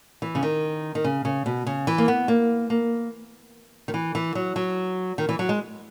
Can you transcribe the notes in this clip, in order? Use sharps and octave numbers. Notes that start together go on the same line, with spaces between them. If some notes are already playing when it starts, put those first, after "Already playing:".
E3
C#3
D#3
D#3
C#3
C#3
B2
C#3
E3
A#3
B3
A#3
A#3
D#3
E3
E3
F#3
F#3
D#3
E3
F#3
G#3